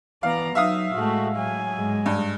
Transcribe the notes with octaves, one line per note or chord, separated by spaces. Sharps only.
E3 B3 D5 F5 A#5
F#3 D#4 E5 F5 D#6
A2 G#3 A3 F#4
F#3 G#5
G#2 G#3
G2